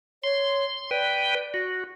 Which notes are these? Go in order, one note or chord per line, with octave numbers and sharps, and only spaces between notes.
C#5 C6
B4 D5 G5
F#4